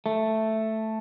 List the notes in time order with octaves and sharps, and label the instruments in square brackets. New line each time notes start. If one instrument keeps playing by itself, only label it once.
[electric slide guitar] A3